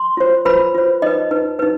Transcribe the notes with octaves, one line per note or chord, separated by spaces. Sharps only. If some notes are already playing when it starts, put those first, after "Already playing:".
Already playing: C6
F4 C5
F4 B4 C5 B5
F4 C5
D#4 B4 D#5
D#4 B4
D#4 B4